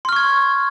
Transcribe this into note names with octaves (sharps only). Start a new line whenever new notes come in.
C6 C#6 F6 G#6